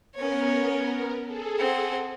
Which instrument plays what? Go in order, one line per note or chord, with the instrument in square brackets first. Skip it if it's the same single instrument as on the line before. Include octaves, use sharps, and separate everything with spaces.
[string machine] B3 A#4 [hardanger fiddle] C#4 C#5
[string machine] G#4 A4
[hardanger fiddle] C4 F#5